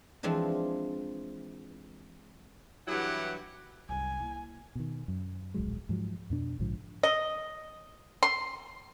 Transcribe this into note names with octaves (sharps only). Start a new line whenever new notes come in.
E3 F3 G#3 C4 D4
G2 E3 F#3 E4 G4 F#5
C2 F#2 G#5
A#3 E4
B2 D#3
F#2
D1 A#1 F#3 G#3
G#2 F3 F#3
F2 B2 D4
A#1 G#2 D3 F3
D#5
C6